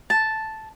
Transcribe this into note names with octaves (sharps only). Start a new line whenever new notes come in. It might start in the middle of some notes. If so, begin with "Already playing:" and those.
A5